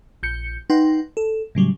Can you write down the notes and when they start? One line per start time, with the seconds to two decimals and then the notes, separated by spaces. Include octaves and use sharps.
0.23 A#1 G6 C#7
0.70 D#4 B4 F#5 G5 C6
1.17 A4
1.55 A2 C#3 F#3 G3